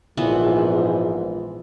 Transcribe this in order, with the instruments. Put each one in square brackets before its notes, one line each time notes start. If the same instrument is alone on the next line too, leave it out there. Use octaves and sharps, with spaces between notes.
[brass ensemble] A#1 G#2 [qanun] E3 B3 [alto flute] F4